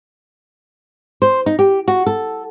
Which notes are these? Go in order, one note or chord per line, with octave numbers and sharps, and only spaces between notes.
C5
D#4
G4
F#4
A4